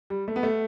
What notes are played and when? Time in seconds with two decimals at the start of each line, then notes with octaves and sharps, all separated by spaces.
0.10 G3
0.28 A3
0.36 B3
0.43 A3